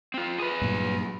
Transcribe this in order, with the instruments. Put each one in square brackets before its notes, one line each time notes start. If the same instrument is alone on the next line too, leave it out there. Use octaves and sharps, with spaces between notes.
[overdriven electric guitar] C4 F4
G#4 B4
[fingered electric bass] G2 A#2 F#3